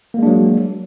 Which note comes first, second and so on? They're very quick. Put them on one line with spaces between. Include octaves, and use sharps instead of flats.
A#3 G#3 D4 F#3